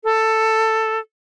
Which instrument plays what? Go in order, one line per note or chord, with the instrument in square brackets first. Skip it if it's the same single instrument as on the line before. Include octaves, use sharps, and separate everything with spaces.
[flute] A4